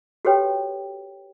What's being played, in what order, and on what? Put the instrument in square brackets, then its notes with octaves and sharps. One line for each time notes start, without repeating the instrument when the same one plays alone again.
[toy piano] F#4 G4 A4 B4 C#5 G5